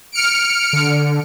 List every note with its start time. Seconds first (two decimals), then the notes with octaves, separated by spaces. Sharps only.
0.12 F6 C#7 D7
0.73 D3